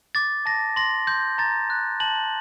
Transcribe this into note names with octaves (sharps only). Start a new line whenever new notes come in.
D6 A6
A5 A#6
C6 A#6
C6 G6
A#5 A6
F#6
A5 F#7